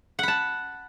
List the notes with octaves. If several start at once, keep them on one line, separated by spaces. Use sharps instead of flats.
F#5 A5 B5